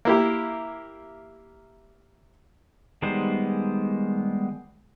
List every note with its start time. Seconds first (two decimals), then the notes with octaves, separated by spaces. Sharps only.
0.05 A#3 E4 G4
3.02 D#3 G3 G#3 B3 C5